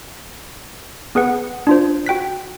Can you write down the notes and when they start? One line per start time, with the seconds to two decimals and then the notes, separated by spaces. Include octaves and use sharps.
1.15 B3 G#4 B4 F#5
1.67 D4 F4 C5
2.06 F#4 G5 F#6 B6